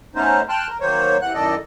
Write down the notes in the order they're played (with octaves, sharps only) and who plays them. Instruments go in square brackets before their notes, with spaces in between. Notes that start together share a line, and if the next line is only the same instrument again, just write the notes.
[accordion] A3 B3 C#4 D#4 C5
G5 A5 C6 F6 F#6
A#4
D#3 F#3 A#3 C5 C#5
C3 E3 F#5 F#6
F#2 A2 D#3 A4 D5 D#5